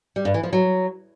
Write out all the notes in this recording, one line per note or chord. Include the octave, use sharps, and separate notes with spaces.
G3
G2
E3
F3
F#3